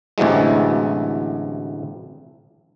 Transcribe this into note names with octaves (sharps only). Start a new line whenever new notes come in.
A1 D2 C3 E3 F#3 G#3